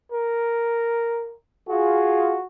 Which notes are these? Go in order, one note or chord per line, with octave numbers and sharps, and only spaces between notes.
A#4
F4 F#4 G#4